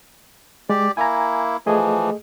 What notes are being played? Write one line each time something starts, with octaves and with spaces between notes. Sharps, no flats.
G#3 G4 D5
A#3 E4 G#5 A#5
E3 F3 A3 G#4 D#5